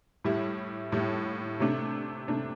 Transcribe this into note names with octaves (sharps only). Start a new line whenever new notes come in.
A2 G3 E4
A2 G3 E4
C3 A3 D4
C3 A3 D4